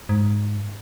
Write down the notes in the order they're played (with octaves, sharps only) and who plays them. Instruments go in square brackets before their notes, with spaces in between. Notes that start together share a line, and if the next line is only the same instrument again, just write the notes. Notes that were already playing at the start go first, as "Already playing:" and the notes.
[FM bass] G#2